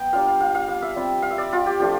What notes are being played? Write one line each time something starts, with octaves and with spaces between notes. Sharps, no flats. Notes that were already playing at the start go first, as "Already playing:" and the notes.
Already playing: B3 G5
G3 D4 F4 F5
F5
F5
F5
F5
E5
G3 C4 F4
F5
E5
D5
F4
G4
F3 A3 D4 F4 G4